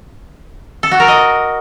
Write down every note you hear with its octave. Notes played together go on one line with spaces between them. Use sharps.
A4
F#4
A#4
D#5